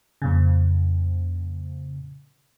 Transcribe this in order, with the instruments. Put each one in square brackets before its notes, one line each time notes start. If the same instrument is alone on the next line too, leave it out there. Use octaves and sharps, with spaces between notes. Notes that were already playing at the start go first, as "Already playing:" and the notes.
[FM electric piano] F2 A#2 C#3